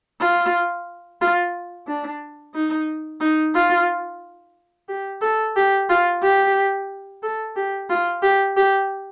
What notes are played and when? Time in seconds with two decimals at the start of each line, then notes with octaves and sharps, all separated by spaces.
0.21 F4
1.21 F4
1.87 D4
2.55 D#4
3.21 D#4
3.55 F4
4.89 G4
5.22 A4
5.56 G4
5.89 F4
6.22 G4
7.23 A4
7.56 G4
7.90 F4
8.22 G4
8.57 G4